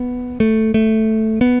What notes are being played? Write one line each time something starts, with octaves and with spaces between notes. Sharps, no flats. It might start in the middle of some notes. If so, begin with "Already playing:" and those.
Already playing: B3
A3
A3
B3